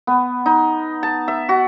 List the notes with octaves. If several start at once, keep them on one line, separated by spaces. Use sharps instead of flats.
B3
D#4
A5
E5
F#4